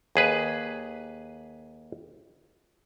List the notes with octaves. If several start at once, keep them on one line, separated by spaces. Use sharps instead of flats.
D#2 G#4 B4